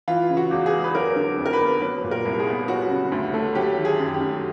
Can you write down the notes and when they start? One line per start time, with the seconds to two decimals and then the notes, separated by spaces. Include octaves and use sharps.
0.08 E3 F4
0.30 C#3
0.37 F#4
0.51 E2
0.66 G#4
0.73 G#3
0.83 B4
0.95 F#3 A#4
1.16 D3
1.38 F2
1.46 A#4
1.53 B4
1.60 B3
1.81 F#3 B4
2.04 A#2
2.11 A#4
2.25 C2
2.40 G#4
2.48 B3
2.68 F#3 F#4
2.90 C#3
3.12 D2
3.34 A3
3.55 F#3 G4
3.77 D#3
3.85 G#4
4.00 F#2
4.14 G4
4.21 F#2